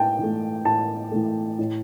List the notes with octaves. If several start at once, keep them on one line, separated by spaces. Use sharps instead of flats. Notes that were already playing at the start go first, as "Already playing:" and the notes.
Already playing: A2 G5 A5
E3 A3
A2 A5
E3 A3
A2